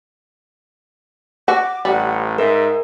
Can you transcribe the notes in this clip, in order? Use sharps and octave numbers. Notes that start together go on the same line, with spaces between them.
F#4 D6
A1 G3 F#5
G#2 A#4 E5